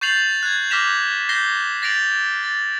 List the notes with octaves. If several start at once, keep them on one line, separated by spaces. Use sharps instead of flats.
C#6 G6 A6 C7 F7 F#7
F#6 G#6
D6 F6 A#6 B6 E7 F7
G6 A#6 C7 G7
A6 A#6 C7 D7 F7 F#7
A6